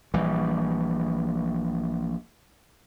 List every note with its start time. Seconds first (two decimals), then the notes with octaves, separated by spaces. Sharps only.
0.14 A#1 E3 G3